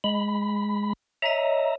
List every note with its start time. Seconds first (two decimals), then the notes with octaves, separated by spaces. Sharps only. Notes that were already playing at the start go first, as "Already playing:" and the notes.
0.04 G#3 B5
1.22 C#5 D#5 E5 A#5